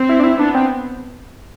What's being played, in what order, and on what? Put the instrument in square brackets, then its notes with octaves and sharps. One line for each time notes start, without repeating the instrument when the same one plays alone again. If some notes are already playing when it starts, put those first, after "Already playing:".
Already playing: [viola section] C4
[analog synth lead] E4
D4
E4
[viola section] B3 [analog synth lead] D4
[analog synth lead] C4